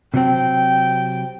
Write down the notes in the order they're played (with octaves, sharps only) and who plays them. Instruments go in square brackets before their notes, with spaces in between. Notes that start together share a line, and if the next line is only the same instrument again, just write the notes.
[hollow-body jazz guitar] C3 F#3 C4 [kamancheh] G5